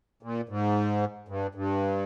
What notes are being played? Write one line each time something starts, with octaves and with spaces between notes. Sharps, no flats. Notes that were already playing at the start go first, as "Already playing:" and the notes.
A#2
G#2
G2
G2